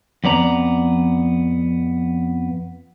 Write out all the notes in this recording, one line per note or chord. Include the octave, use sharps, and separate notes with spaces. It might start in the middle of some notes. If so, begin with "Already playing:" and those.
F2 B3 D5 A#5